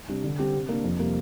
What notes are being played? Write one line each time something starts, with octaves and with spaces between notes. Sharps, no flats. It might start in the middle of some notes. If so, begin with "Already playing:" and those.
C3 G3 D4
D3
G3 C4 G4
C3
A#3 D4
F2
C3 G3 A#3